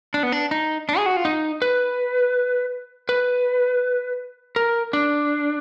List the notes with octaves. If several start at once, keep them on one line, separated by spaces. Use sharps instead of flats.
D4
B3
D4
D#4
D4
G#4
F#4
F4
D#4
B4
B4
A#4
D4